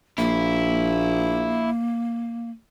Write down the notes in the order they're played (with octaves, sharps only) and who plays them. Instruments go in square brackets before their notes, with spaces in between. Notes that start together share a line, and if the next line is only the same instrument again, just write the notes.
[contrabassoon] A#1 [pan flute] A#3 [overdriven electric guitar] E4